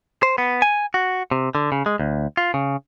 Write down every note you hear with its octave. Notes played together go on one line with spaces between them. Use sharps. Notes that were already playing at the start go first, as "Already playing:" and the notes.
C5
B3
G#5
F#4
C3
D3
C#3
G#3
D2
F4
C#3